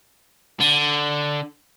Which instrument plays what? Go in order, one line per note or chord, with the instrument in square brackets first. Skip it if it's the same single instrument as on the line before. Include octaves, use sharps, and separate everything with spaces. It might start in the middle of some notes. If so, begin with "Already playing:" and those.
[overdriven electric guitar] D3